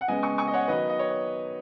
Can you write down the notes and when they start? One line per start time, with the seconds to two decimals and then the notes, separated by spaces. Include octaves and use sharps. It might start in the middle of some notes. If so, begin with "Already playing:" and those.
0.01 F#5
0.08 C#3 G#3 B3 D#5 G#5
0.22 G#5 C#6
0.38 G#5 C#6
0.47 D#5
0.53 C#5 F#5
0.68 D#3 F#3 B3 B4 D#5
0.89 D#5
0.99 C#5